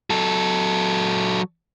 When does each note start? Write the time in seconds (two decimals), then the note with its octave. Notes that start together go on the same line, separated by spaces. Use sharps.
0.10 F#3 A4